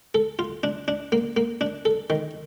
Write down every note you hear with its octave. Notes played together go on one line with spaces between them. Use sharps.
A4
F4
D4
D4
A#3
A#3
D4
A4
D#3